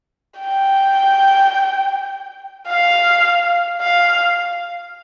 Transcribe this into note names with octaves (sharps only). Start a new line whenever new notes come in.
G5
F5
F5